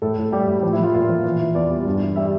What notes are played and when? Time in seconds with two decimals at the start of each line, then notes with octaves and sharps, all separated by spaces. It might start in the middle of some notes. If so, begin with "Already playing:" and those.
0.02 A2 A4
0.18 A2
0.32 G3 G4
0.48 A2
0.63 F3
0.73 E4
0.78 F3
0.83 F4
0.94 A#2 F4
1.09 F3
1.24 E3
1.40 E3
1.55 E2 D5
1.71 G3
1.85 G2
2.01 E3
2.16 G3 E5